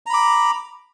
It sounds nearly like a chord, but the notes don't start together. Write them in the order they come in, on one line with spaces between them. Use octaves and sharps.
A#5 B5 D6